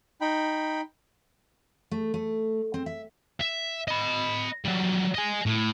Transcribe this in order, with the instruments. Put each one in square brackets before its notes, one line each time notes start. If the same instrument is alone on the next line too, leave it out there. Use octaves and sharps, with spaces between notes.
[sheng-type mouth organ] D#4 G5 B5
[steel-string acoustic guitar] A3
A3
C4
E5
[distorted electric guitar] E5
D#5 B5
F#3 G3
D#5 G#5
A2